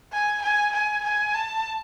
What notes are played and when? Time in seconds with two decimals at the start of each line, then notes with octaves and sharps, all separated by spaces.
0.12 G#5
0.42 G#5
0.73 G#5
1.04 G#5
1.34 A5